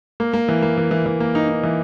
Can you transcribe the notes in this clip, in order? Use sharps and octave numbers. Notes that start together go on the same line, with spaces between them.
A#3
A#3
E3
A#3
E3
E3
E3
A#3
D#4
D#4
E3